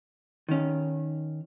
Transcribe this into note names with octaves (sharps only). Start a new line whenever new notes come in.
D#3 C#4